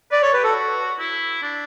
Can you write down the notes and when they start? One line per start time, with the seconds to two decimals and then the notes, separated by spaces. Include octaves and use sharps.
0.11 B4 D5
0.22 A4 C#5
0.33 G4 B4
0.44 F#4 A4
0.99 E4
1.43 D4